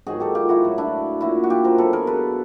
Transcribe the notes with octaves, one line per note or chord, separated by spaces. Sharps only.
G#2 D#3 F#3 F#4 G#4
G4 A4
F4 G4
E4 F#4
A2 F#3
D4 E4
A#2 F#3 E4 F#4
F#4
F4 G4
A#4 C5
B2 F#3 A4 B4
G#4 A#4
A4 B4